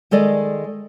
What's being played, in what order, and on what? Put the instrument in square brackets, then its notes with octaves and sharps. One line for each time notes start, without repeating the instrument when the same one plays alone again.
[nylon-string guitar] D#3 G#3 A4 D5 D#5